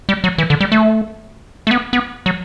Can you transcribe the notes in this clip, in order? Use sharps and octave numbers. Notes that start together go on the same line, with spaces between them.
G3
F#3
E3
D3
G3
A3
A3
B3
B3
F#3